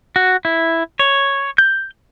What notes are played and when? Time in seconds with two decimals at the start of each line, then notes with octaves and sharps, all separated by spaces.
0.16 F#4
0.45 E4
0.99 C#5
1.58 G6